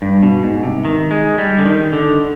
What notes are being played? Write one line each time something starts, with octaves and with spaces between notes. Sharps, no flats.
G2
B2
G#2
C3
D#3
G#3
G3
D3
D#3
D3